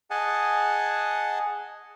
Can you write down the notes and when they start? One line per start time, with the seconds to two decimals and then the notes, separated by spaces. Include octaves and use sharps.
0.10 G#4 D#5 F#5 G#5 A5